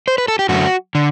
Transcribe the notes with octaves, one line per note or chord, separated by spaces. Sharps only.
C5
B4
A4
G4
F#2 D3 A3 F#4
D3